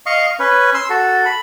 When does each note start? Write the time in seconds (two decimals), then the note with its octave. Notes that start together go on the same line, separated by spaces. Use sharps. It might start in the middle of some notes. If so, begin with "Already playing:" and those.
0.06 D#5 F5 C#6
0.39 C#4 B4
0.74 C6 E6
0.90 F#4 A4
1.25 B5